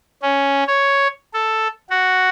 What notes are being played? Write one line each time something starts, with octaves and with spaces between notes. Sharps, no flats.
C#4
C#5
A4
F#4